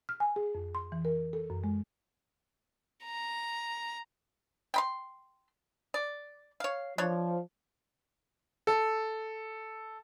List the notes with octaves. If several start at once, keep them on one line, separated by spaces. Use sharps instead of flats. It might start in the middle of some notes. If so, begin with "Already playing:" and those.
F6
G#5
G#4
F2
C6
E3
A#4
A4
F#2
G#3
A#5
G5 B5 C6
D5
C#5 F5
F3 D4 C#5
A4